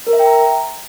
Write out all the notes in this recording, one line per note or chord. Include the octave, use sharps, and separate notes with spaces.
A#4
E5
G5
A#5